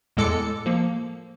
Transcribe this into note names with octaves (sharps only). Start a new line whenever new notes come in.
E2 A2 G#3 A4 D6 C#7
F3 A#3